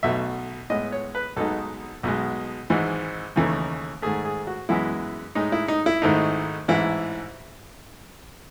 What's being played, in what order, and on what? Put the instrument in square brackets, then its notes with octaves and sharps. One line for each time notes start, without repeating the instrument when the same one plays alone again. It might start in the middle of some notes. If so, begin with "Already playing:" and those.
[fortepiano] B1 B2 A3 E5
A2 G#3 B3 D#5
C#5
B4
B1 B2 G#3 D#4 A4
B1 B2 G#3
G#1 G#2 E3
D#2 C#3 E3 A3 D#4
G#2 D#3 A3 G#4
G#4
F#4
F#2 E3 G#3 B3 E4
A2 G#3 D#4
E4
D#4
E4
G#1 G#2 D#3 A3 D#4
A1 G#2 E3 E4